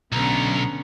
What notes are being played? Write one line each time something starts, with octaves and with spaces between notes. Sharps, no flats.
B1 D3 B3 C#4 A#5